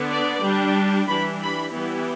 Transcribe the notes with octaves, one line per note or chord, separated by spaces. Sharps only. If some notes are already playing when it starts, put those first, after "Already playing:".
Already playing: D3 B3 D4
D5
G3 D4
E3 G3 D4 B5
B5
E3 G3 B3 E4